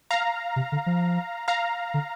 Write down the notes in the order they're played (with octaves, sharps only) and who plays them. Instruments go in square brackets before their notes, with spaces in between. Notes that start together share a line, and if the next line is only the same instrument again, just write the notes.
[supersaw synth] F5 A#5
[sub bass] C3
D3
F3
[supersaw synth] F5 A#5
[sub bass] D3